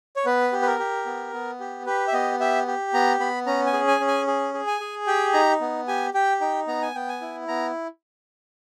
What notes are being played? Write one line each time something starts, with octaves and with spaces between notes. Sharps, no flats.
C#5
B3 B4
G4
B4
A#4
G4
B3
B3
G4
G4 B4
E5
B3 D#5
G4 E5
G4
B3 A#5
B3 B5
C#4 A#5
G#5
G#4
G#5
C#4
G#5
G#4
G#4
G#5
G#4
G4 G5
D#4 A#5
B3
G4 G#5
G4 G5
D#4 G5
B3 A#5
G#5
B3 G5
G#5
E4
B3 A#5